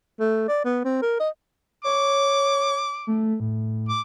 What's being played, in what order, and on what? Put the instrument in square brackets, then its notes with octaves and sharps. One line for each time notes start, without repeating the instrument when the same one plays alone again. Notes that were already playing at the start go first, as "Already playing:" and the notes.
[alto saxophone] A3
D5
B3
C4
A#4
D#5
[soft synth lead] C#5 [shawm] D6
[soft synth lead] A3
A2
[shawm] D6